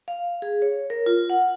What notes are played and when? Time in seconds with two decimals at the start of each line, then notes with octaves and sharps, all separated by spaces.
0.08 F5
0.42 G#4
0.62 C#5
0.90 A#4
1.06 F4
1.30 F#5